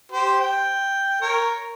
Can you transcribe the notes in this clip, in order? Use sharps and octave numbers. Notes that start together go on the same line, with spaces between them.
G4 C5
G5
A#4 C#5